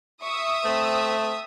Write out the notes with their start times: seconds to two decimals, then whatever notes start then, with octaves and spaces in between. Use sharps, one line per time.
0.22 E5 C#6 D#6
0.65 A3 C4